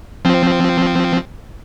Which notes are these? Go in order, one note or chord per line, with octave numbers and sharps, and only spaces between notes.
F3 C4